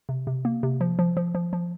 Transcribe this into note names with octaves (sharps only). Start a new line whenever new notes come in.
C3
C3
A#3
C3
F3
F3
F3
F3
F3